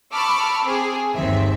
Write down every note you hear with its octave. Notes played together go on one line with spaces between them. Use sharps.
A5 B5 C#6 D6 E6 F6
C4 G#4
G1 D#2 D#3 C4 E5